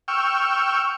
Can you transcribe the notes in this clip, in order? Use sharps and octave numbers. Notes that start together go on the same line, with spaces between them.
G5 C#6 E6 F6